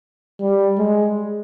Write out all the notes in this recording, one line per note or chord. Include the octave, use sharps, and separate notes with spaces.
G3
G#3